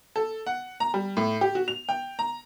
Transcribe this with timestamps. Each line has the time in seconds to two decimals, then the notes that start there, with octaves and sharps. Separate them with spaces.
0.16 A4
0.46 F#5
0.80 A#5
0.94 G3
1.17 A2
1.41 G4
1.55 F#4
1.68 F7
1.89 G5
2.19 A#5